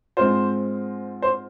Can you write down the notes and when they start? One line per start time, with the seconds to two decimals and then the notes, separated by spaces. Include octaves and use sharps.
0.17 G#2 G#3 C4 F4 C5
1.22 C5